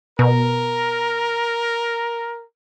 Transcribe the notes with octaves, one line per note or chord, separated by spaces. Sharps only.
B2 A#4